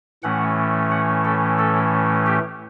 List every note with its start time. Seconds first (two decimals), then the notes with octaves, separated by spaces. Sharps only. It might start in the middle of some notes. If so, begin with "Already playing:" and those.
0.23 A2 E3 A3 C#4 F#5
0.91 F#5
1.24 A4
1.59 A4
2.26 G4